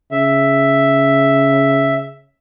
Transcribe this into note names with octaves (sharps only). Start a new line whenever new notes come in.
C#3 E5